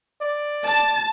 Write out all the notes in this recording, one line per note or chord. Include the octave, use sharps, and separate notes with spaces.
D5
A5